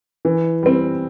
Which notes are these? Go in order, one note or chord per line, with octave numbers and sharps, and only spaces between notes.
E3
G3 C4